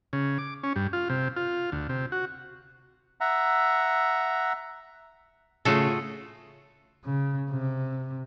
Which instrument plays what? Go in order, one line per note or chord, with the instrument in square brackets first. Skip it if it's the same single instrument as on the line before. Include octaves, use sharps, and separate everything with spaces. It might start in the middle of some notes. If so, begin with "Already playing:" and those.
[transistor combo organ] C#3
D6
C#4
G2
F4
C3
F4
D2
C3
F#4
[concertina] E5 F#5 A#5
[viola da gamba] A2 F4 G#4 [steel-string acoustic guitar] C#3 [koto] A3 F#4 A4
[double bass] C#3
C3